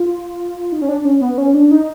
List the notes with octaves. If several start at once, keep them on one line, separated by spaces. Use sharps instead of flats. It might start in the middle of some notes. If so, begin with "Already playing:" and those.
Already playing: F4
D#4
C#4
D4
C#4
B3
C#4
D4
D#4